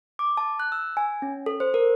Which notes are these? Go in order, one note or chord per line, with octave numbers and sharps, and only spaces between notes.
D6
A5
F#6
E6
G#5
C#4
A4
C5
A#4